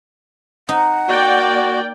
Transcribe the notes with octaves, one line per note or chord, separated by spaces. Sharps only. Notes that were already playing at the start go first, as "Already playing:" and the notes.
D#4 F#5
A#3 F#4 D5 G5